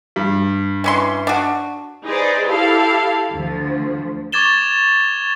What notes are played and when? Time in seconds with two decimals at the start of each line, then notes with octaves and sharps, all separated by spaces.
0.16 G2
0.84 E3 C#4 C6
1.27 D4 F#4
2.05 D#4 G#4 B4 C5 D5
2.45 E4 G4 A4 F5
3.33 D2 F3
4.32 C#6 D6 G#6 A6 E7 G7